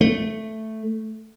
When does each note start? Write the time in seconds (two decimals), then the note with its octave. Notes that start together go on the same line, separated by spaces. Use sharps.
0.01 A3